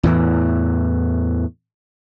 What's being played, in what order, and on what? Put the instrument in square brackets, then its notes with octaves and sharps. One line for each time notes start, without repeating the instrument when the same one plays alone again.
[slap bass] E2 A2 E3